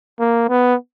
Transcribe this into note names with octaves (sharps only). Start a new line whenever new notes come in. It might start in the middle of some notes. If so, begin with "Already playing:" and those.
A#3
B3